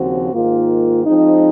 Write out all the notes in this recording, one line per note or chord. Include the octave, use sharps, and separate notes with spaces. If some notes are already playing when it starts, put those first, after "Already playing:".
Already playing: D#2 C#3 F3 C4 F#4
G#2 D#3 A#3 F4
F3 G#3 C4 D#4